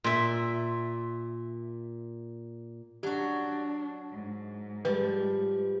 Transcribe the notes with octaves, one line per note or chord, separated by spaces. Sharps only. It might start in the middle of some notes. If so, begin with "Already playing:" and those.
A#2 E5
F#3 D4 F#4 G4
G#2
F3 G3 B4